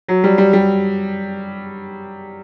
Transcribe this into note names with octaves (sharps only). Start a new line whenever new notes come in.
F#3
G3
G3
G3